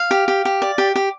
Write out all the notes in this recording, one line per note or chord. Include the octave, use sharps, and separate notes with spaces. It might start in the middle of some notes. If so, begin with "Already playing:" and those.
Already playing: F5
G4
G4
G4
D5
G4
G4